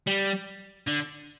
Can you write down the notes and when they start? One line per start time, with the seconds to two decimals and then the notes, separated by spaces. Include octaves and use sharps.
0.07 G3
0.87 D3